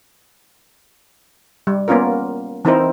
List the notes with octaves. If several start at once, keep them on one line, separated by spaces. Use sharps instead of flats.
G3
A#3 B3 C#4 F4 A#4
E3 C4 D#4 E4 A#4 C5